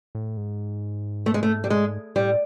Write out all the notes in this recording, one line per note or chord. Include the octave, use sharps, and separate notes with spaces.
A2
G#2
A3
G#3
A3
G3
G#3
A2 G3